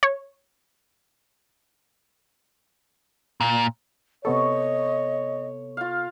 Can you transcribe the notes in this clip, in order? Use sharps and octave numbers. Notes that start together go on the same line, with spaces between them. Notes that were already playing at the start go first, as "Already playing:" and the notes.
C#5
A#2
C3 B3 A4 C#5 D#5 C#6
F4 F5